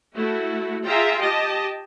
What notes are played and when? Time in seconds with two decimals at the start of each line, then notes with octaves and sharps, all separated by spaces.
0.14 A3 E4 F#4
0.85 F4 G#4 E5 G5 A#5
1.21 G4 D#5 A5